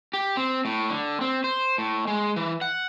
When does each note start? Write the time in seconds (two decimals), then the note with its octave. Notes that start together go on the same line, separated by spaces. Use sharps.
0.13 G4
0.37 C4
0.65 A2
0.90 D3
1.21 C4
1.44 C5
1.78 A2
2.07 G#3
2.36 E3
2.61 F#5